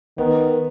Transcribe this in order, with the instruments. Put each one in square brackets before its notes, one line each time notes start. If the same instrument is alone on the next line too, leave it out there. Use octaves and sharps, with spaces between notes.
[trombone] D#3 [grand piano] B3